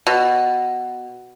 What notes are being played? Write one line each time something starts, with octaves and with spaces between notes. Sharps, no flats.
B2